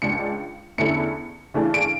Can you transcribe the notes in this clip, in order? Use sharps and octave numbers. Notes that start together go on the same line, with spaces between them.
C#2 C#3 G#3 D4 C#7
E2 D3 A3 C#4 E4 C#7
C#3 E3 A3 D4
D7